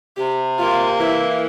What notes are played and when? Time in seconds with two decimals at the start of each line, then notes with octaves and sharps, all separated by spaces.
0.17 C3 G4
0.59 A#3 F4
1.00 E3 E4